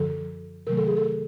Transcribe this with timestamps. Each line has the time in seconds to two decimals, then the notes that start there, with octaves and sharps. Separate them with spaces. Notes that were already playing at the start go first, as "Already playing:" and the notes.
Already playing: F#2 D3 F3 A4
0.67 C3 D#3 F#3 A3 A#4
0.77 A4
0.87 G#4
0.97 A4